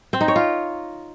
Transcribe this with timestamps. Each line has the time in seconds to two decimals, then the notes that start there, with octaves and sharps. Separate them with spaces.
0.13 C4
0.21 D#4
0.28 C#5
0.36 F4